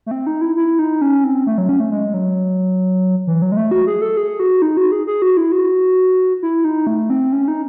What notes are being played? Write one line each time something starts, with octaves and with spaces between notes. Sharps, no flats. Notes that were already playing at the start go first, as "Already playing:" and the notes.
A3
C4
D#4
E4
E4
D#4
C#4
C4
A3
F#3
C#4
A3
G#3
F#3
E3
F#3
G#3
A3
F#4
G#4
A4
G#4
F#4
D#4
F#4
G#4
G#4
F#4
E4
F#4
E4
D#4
A3
C4
C#4
D#4